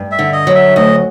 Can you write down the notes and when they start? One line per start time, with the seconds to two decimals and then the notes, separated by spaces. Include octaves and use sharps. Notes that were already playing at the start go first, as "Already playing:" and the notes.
Already playing: G2
0.11 E5
0.19 D3
0.33 D#5
0.47 F#3
0.55 E5
0.76 D2 D#5